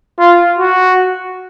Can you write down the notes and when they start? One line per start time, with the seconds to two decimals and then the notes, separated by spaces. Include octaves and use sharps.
0.20 F4
0.59 F#4